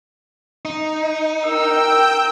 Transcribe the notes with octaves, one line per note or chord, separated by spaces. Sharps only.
D#4
A#4 G5 E6